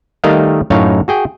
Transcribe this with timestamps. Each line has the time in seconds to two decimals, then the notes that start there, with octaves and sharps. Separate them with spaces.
0.24 D#3 G3 A3 A#4 D#5 F5
0.70 F#2 A2 D#4 C#5 F5
1.08 F#4 G#4 G5